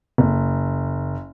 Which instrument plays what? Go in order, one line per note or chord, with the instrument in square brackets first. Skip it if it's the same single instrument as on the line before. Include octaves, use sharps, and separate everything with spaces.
[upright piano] F#1